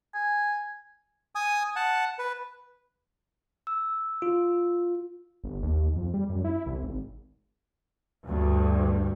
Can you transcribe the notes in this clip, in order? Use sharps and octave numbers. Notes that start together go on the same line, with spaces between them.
G#5
G#5 D#6
F#5 A5
B4
E6
F4
G1
D#2
F2
G3
F#2
E4
C2
G#1
D2 G2